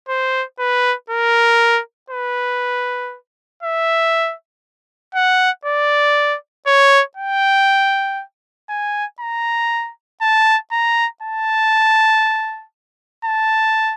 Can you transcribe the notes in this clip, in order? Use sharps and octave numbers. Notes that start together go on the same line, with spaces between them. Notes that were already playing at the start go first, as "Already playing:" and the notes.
C5
B4
A#4
B4
E5
F#5
D5
C#5
G5
G#5
A#5
A5
A#5
A5
A5